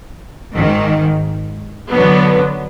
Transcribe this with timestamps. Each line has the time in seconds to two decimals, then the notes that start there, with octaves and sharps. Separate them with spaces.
0.57 G#1 G#2 D#3
1.91 D3 F#3 B3